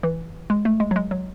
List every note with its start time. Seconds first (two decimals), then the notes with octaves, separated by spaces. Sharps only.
0.03 E3
0.50 G#3
0.65 A3
0.80 G#3
0.91 F#3
0.96 G#3
1.11 F#3